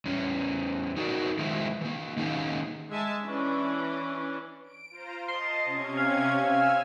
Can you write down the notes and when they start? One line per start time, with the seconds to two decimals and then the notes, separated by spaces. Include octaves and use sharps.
0.05 E2 C#4
0.96 D#4 F#4 A4 A#4 C5 D5
1.38 D#3 F3 G#3 B3 E4 F4
1.81 E3 A#3
2.17 D#3 A#3 C#4 D#4 G#4 F5
2.90 G#3 E5 G#5 A5
3.22 E3 C#4 D4
4.63 D7
4.91 F4 C5 A#5
5.28 D#5 A5 C6
5.65 C3 C#4 G#6
5.97 F5
6.32 G#5 E6 F6